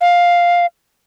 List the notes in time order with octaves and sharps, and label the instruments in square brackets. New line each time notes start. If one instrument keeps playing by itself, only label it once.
[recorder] F5